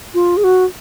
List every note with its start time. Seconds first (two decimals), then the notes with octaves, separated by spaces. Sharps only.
0.14 F4
0.37 G#4
0.44 F#4